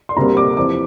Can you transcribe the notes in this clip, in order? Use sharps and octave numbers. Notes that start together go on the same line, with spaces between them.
C6
D2 C3 G3 A#3 A#5
D6
F2 C3 E3 D6